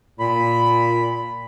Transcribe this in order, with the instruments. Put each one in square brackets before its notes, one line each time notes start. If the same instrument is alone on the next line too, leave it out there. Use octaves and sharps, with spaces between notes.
[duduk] A#2 [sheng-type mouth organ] B5